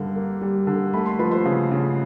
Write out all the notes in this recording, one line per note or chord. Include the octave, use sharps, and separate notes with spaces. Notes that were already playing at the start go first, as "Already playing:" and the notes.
Already playing: G2 D3 G3 A#4
A#3
G3
D3
A3 B5
C6
F3 B4 B5
C5 C6
C#3
C#3